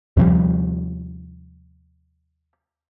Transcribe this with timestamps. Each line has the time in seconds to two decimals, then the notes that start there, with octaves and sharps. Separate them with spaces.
0.17 D#2 C3 F3 G3